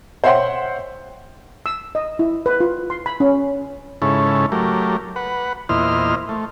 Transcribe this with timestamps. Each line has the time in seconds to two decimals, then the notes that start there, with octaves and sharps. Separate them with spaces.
0.24 C5 C#5 E5 F#5 G5 C6
1.66 E6
1.95 D#5
2.19 E4
2.46 B4
2.60 F4
2.90 C6
3.06 B5
3.20 C#4
4.02 G#2 C#3 C#4 E4 A4
4.52 F#3 A3 G4 A#4
5.16 B4 F#5
5.69 E2 A#2 E4 C5 D#5 F6
6.29 A3